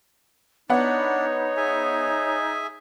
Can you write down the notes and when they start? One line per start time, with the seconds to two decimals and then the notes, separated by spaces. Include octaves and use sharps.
0.70 B3 D4 D#4 C#5 F#5
1.57 G#4 E5 G#5